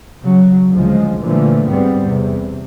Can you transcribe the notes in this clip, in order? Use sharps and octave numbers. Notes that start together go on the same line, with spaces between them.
C#3 F#3
D2 C#3 F3 G#3
A#2 D3 E3 F3 A3
G#2 G3 B3 C4
E2 C3